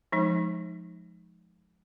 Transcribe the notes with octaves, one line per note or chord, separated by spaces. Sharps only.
F3 G#3 D#4